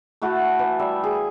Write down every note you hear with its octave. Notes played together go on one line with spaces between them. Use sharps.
A3 E4 F#4 A4
E3
G3 E5
G#4